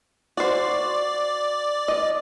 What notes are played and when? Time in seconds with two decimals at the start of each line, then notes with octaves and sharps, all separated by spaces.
0.37 F#4 C5 D5
1.88 D#5